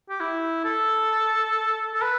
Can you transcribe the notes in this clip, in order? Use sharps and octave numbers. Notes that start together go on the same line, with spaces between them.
G4
E4
A4
A4
B4